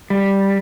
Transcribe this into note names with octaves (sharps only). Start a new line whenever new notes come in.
G3